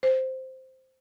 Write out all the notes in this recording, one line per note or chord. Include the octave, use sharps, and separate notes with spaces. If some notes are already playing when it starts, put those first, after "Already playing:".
C5